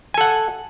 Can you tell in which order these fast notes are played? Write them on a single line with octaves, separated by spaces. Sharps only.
G#5 A4 F#5